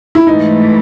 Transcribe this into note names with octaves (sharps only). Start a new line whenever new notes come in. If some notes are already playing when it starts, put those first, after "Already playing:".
E4
G#2 E3 A3 D#4